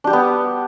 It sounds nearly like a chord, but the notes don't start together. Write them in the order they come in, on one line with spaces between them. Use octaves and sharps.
D4 G4 G3 B3